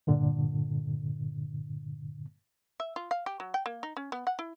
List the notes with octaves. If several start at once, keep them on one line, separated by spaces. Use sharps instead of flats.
G2 A#2 D3
E5
F4
F5
G4
F#3
G5
A#3
D#4
C#4
B3
F#5
E4